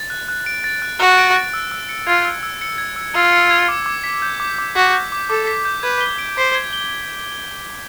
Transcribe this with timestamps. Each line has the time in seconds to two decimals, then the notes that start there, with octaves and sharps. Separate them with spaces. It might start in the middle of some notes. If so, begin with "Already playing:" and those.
Already playing: A6
0.10 F#6
0.29 F#6
0.46 D7
0.64 A6
0.82 F#6
1.00 F#4 F#6
1.18 D7
1.36 A6
1.54 E6
1.72 E6
1.89 C#7
2.07 F4 G#6
2.25 E6
2.43 E6
2.61 C#7
2.78 G#6
2.96 E6
3.15 F4 E6
3.32 C#7
3.51 G#6
3.68 D6
3.86 D6
4.04 B6
4.22 G6
4.40 D6
4.58 D6
4.75 F#4 B6
4.93 G6
5.12 D6
5.30 A4 D6
5.47 B6
5.65 G6
5.83 B4 G#6
6.01 G7
6.19 D7
6.37 C5 B6
6.55 G#6
6.73 G7